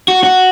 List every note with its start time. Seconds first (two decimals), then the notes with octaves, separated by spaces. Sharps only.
0.08 F#4
0.23 F#4